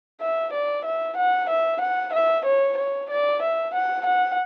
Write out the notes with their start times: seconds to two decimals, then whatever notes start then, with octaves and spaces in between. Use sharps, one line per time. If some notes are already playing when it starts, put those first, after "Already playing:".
0.21 E5
0.53 D5
0.85 E5
1.17 F#5
1.49 E5
1.81 F#5
2.13 E5
2.45 C#5
2.77 C#5
3.10 D5
3.42 E5
3.74 F#5
4.06 F#5